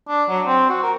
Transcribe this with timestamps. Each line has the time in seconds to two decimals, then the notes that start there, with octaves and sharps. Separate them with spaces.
0.08 D4
0.29 F#3
0.47 C4
0.69 F#4
0.83 A#4